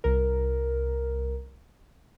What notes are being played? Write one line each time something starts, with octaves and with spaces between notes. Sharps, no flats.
C2 A#4